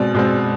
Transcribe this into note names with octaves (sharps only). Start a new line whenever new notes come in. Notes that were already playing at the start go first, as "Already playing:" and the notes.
Already playing: B2 G#3 C4 D5
B2 G#3 C4